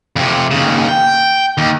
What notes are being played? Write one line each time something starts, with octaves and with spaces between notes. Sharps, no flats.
F2 C3
D#2 C#3
G5
D#2